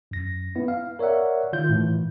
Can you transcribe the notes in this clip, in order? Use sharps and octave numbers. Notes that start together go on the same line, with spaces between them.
F#2 A#6
B3 E4
F5
A#4 C#5 D5 E5 F#5
D#3 F4 G6
A2 E3